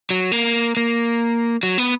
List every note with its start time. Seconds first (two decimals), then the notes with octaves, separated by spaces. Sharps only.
0.10 F#3
0.32 A#3
0.77 A#3
1.63 F#3
1.78 B3